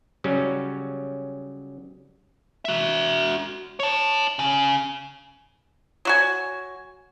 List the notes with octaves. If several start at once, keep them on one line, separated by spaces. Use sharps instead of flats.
C#3 F#3 G3 C#4
F#4 E5
C#5 A5
C#3
F#3 F#4 G#5